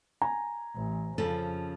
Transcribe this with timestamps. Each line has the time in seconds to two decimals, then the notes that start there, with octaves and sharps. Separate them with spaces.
0.22 G#5 A#5
0.76 A1
1.18 F2 C#3 F3 A4